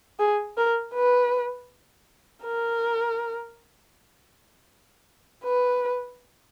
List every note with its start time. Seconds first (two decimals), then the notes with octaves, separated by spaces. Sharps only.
0.19 G#4
0.57 A#4
0.95 B4
2.44 A#4
5.43 B4